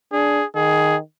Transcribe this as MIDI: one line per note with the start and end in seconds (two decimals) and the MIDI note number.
0.12 0.41 62
0.12 0.45 68
0.55 0.99 51
0.55 0.96 68